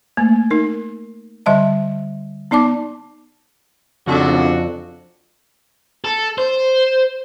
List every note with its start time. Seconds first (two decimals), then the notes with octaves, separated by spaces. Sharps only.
0.17 A3 A#3
0.51 D#4 A#4
1.46 D3 G3 D#5 E5 A5
2.51 B3 D#4 D5 A5 D6
4.07 F2 C#3 C4 D4 F#4 A4
6.04 A4
6.38 C5